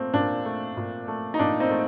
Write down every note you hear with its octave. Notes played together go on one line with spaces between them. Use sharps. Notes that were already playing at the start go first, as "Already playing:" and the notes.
Already playing: A#2 A3 C4
A#2 D4
A3
A#2
A3
D#4
A#2 D4
C4 D#4
A3